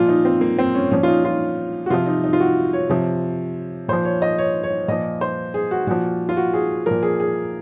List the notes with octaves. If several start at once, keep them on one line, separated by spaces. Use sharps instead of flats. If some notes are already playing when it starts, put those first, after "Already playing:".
Already playing: A#2 F3 F4
D#4
C4
A#3
C4
C#4
A#2 F3 C#4
F4
D#4
F4
F#4
C3 F3 F4
D#4
D#4
F4
F#4
C#5
C3 F3
A#2 F3 C5
C#5
D#5
C#5
C#5
A#2 F3 D#5
C5
G#4
F#4
A#2 F3 F#4
F4
F#4
G#4
A#2 F3 A#4
G#4
G#4